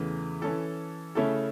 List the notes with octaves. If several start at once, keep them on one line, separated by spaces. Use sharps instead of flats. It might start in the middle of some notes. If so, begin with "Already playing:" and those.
Already playing: E2 C#3 E3 A3
E3 C#4 A4
C#3 A3 C#4 E4 A4